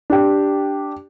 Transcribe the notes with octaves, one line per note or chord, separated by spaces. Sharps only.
D4 G4